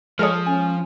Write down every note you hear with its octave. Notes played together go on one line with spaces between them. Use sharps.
F3 G#3 A4 C#5 D#6 F6
C#4 G#5